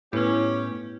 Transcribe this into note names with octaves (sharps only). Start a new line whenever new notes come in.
A2 B3 C#4 E4 G4 B4